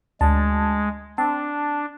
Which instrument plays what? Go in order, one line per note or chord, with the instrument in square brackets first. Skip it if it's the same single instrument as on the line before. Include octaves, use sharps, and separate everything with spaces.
[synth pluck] D2 [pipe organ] G#3 [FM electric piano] A5
[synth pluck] C4 [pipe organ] D4 [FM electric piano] A5